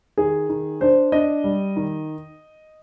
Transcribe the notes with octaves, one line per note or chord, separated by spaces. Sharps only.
D#3 G#4
D#3
D4 C5
D4 D#5
G3
D#3